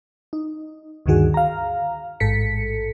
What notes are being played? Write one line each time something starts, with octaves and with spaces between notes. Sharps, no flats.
D#4
D2 G2 D3 D#3 F#4 G#4
F5 A#5
A1 G#2 A4 B6 C#7